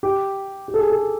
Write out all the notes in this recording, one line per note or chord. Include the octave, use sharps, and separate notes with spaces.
G4
G4
A4
G#4
A4